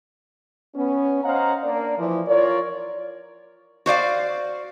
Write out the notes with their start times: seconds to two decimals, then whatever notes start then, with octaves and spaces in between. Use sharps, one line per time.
0.75 B3 C#4
1.24 C5 C#5 D#5 F5 F#5 A#5
1.63 A#3 D4 A#4 D5
1.98 E3 F3
2.27 F4 A#4 C#5 D5
3.86 F#4 C5 D5 F5